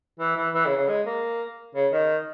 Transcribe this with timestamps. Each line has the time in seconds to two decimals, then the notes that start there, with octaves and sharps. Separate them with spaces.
0.20 E3
0.37 E3
0.55 E3
0.66 C#3
0.77 C#3
0.89 G#3
1.06 A#3
1.75 C#3
1.93 D#3